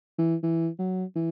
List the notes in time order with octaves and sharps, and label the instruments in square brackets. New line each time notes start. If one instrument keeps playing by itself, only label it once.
[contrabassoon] E3
E3
F#3
E3